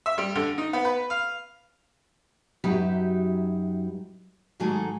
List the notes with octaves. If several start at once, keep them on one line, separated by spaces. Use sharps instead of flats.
E5
G3
D3
D#4
B3
B4
F5
F#2 F#3 D#4 G4 B4 E5
G#2 D#3 F#3 A3 G#4 A4